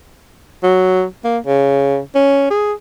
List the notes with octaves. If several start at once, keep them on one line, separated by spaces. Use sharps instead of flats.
F#3
A#3
C#3
C#4
G#4